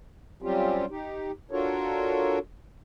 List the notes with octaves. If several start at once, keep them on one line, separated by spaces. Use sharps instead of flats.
F#3 G3 C4 C#4 F4 G4
D#4 G4
D4 F4 F#4 A4 A#4 C#5